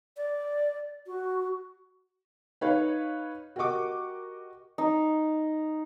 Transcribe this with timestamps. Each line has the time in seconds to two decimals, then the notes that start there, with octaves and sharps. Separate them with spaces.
0.17 D5
1.07 F#4
2.61 D#4 B4 C#5 F5
3.56 F#4 G4 A#4 D#5 C#6 D6
4.78 D#4